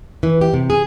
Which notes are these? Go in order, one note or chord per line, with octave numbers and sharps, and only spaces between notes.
E3
G4
C3
G#4